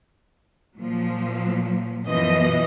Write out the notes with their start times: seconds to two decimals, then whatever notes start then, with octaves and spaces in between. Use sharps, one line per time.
0.78 A#2 F3 F#3
2.04 F#2 B2 E3 F3 D#5